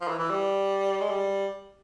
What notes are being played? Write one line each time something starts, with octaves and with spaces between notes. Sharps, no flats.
F3
E3
E3
G3
G#3
G3